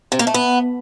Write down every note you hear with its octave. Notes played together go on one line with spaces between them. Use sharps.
C3
A#3
A3
B3